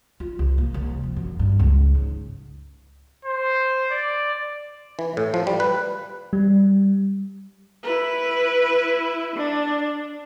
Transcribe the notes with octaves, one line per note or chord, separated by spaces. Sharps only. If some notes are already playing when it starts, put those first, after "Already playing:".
F4
C2
A#3
C2
F3
F#2
G2
C#2
G#2
C5
D5
E3
A2
F3
G3
B4
G3
E4 B4
D4